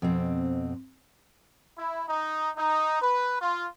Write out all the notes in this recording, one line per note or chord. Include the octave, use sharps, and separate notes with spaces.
F2 B2 C4
E4
D#4
D#4
B4
F4